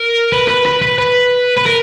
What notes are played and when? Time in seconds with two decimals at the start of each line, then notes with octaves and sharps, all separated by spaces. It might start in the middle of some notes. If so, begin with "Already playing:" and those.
Already playing: A#4
0.32 B4
0.48 B4
0.65 B4
0.82 B4
0.99 B4
1.58 B4
1.66 A#4